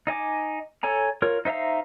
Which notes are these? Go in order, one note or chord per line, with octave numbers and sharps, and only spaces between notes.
D#4 D#5 G#5 D6
A4 C#5 G#5 A#5
F4 A#4 C#5
D#4 C5 E5 F5 A#5